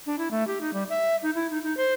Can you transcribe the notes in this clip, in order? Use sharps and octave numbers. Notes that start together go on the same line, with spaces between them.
D4
E4
A3
G4
D#4
G3
E5
D#4
E4
D#4
D#4
C5